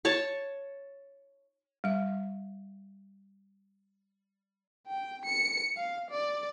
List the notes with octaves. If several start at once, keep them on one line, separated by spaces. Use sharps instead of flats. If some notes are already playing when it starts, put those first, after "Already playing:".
C#5 A5 C#6
G3 E5
G5
C#7
F5
D5